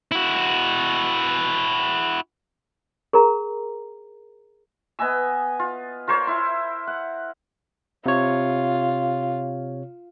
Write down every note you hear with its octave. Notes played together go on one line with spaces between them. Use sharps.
E4 F#4
G#4 A#4 A#5
B3 D#5 G#5 E6
F4
F4 A#4 C5 C#5
E4 C6
F#5
C3 F4 C#5